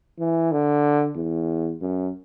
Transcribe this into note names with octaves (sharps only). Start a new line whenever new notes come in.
E3
D3
E2
F#2